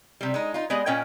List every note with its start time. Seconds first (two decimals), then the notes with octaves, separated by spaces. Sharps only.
0.21 C3 G3
0.34 G#3 D#4
0.54 D#4 F4
0.70 G#3 B3 G4 G#4 D5 D#5
0.86 A#2 C#4 C#5 D#5 G5